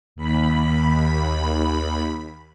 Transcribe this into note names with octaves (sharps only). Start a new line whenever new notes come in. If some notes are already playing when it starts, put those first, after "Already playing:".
D#2 B5